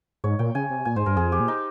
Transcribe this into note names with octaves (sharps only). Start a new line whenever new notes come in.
G#2 C#5
A#2 G5
C#3 G#5
C3
A#2 G#5
G#2 C5
G2 A#4
F2 G#4
G4
A#2
D#4